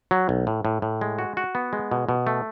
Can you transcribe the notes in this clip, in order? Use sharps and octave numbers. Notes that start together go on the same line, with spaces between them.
F#3
B1
A2
A2
A2
G#3
F#4
F#4
B3
G#3
B2
B2
A3